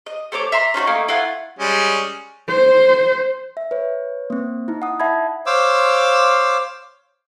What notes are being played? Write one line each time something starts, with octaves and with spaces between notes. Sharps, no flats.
D#5
A3 C5 C#5 D6
E5 A#5 C6
C#4 D#4 F4 F#4
A3 A#3 D#4 G#5
E4 F4 F#5 G#5
G3 G#3 C#4
C5
E5
B4 C#5
A#3 C4
D#4 E4
F#5 D#6
E5 F#5 A5 B5 G#6
C5 C#5 F5 D6 E6